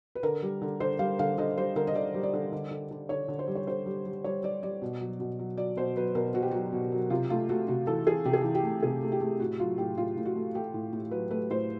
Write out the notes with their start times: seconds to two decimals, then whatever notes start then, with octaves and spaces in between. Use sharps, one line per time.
0.15 B4
0.23 D3 A#4
0.42 G3
0.62 D3
0.80 D3 C5
0.99 G3 F5
1.19 D3 F5
1.38 D3 D#5
1.57 G3 C5
1.76 D3 A#4
1.87 D#5
1.95 D3 D5
2.14 G3
2.23 D5
2.34 D3
2.52 D3
2.71 D3
2.91 D3
3.09 D3 C#5
3.28 D3
3.39 C5
3.47 G3
3.55 C#5
3.67 D3 C5
3.86 G3
4.06 G3
4.24 G3 C#5
4.43 G3 D5
4.63 G3 D5
4.82 B2
5.01 F#3
5.20 B2
5.39 F#3
5.57 F#3 D5
5.77 B2 C5
5.96 F#3 B4
6.15 B2 A#4
6.34 B2 F#4
6.42 G4
6.51 F#3 F#4
6.72 B2
6.92 F#3
7.10 C3 F4
7.30 A3 F4
7.49 A3 F#4
7.68 C3 F#4
7.87 E3 A4
8.06 E3 G#4
8.25 C3 G4
8.33 G#4
8.41 E3 G4
8.55 G4
8.63 A3
8.83 C3 G#4
9.02 A3
9.12 G4
9.21 A3
9.40 A2 F#4
9.60 F#3 F4
9.78 A2 G4
9.97 A2 F4
10.17 A2
10.25 F#4
10.36 A3
10.55 A3 G4
10.74 A2
10.93 A2
11.11 F#3 B4
11.30 A3 B4
11.50 A2 C5